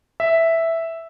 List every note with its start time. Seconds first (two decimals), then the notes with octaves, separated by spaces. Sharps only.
0.20 E5